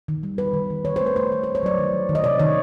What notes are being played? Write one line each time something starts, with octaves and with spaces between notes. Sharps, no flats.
D#3
G3
G3 B4
D#3
D#3
D#3 C#5
A3 C5
B4
A3 C5
D#3 B4
C5
A3
C#5
F#3 D5
D#3
D#3
D#3
D#5
C3 D5
D#3 C#5